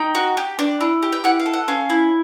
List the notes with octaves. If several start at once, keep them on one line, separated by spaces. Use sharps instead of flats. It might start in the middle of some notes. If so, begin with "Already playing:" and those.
Already playing: D#4 G5
F#4
G4
D4
E4
G4
G5
E4 F#5
F5
A4
F#5
C#4 F5
E4